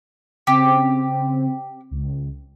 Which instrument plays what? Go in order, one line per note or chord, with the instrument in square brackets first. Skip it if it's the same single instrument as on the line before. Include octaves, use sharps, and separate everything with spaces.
[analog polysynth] C#3 C4 [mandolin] G4
[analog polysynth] C#2